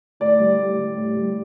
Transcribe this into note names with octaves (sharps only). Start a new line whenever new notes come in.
A2 D5
G3
A2
G3
A2
G3